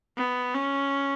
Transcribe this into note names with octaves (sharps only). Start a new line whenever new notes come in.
B3
C#4